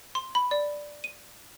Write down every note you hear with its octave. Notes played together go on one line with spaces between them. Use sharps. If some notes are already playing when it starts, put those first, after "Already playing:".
C6
B5
D5
D#7